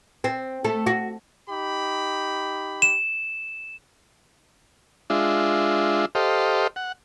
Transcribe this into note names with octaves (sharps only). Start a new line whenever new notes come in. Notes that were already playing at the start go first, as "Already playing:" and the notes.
C4
A3 A4
F#4
D#4 G4 B5
E7
G#3 D4 F4 E5
G4 A4 C5 D#5 F5
F#5